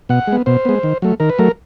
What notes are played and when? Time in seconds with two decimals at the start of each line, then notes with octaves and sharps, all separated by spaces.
0.09 B2 F#5
0.27 G#3 B3
0.46 B2 C5
0.65 G#3 B3
0.83 D#3
1.02 F#3 A3
1.20 D#3 A#4
1.30 B4
1.39 F#3 A3 A#4